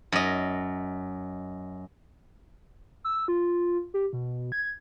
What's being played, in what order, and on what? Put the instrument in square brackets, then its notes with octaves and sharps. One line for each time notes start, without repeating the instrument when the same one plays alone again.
[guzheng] F#2 D#5
[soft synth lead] E6
F4
G4
B2
G#6